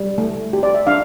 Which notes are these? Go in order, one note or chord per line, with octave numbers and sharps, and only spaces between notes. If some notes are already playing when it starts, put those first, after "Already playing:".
Already playing: G3
A3
G4
D5
E5
D4 F5